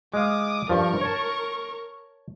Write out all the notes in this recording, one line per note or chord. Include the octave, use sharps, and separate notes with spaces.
G#3 F5 D6 D#6
G2 F3 A#4 C#6
C#5 A5